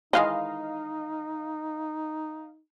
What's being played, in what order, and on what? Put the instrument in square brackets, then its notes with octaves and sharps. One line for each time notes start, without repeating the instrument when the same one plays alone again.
[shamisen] D#3 E3 G#3 [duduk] D#4 [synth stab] D#5 F5